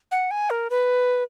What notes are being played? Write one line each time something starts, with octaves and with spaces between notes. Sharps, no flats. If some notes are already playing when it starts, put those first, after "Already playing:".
F#5
G#5
A#4
B4